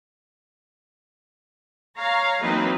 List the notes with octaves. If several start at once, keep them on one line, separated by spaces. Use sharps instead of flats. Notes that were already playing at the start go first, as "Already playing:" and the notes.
C#5 F5 A#5
E3 F#3 A#3 C4 D#4 B4